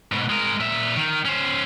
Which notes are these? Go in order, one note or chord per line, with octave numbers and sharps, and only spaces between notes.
G#2 B2
G#3 A#4
A#2 E5
D#3
C#4 C5